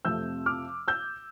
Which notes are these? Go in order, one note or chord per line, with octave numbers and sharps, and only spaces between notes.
F2 C3 F3 A3 E6 G6
D6 F6
E6 G6